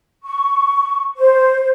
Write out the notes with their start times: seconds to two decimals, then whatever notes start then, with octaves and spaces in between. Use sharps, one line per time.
0.24 C#6
1.18 C5